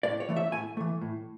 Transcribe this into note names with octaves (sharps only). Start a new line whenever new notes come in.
A2 D5
C#5
E3 A3
E5
A2 G#5
E3 A3
A2